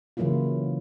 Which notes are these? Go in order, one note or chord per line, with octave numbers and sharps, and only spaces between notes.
C#3 E3 F#3 A#3 E4 F4